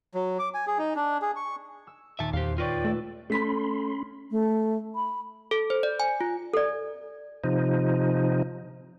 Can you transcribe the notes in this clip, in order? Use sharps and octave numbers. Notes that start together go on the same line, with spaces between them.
F#3
D6
G#5
G#4
D#4
D4
G#4
C#6
E6
D#2 A#2 E5 A5
E2 G4 C5 F5
F4 B4 C#5 D5 G5 C#6 A#6
A3 E6
A3 C#4 B5 C6 B6
A3
B5
A4
C5
D5
G#5
F4
A4 D5
C3 F3 D#4